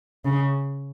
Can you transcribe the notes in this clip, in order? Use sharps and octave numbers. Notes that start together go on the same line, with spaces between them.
C#3